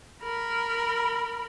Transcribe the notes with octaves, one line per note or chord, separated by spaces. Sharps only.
A#4 B5